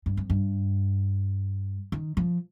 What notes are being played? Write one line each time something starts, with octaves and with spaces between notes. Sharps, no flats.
G2
F2
G2
D#3
F3